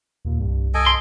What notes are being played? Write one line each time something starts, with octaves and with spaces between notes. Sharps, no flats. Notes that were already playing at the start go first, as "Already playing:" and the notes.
D#2 A#2
C2 G2
A4 D#5 G#5 D7
C6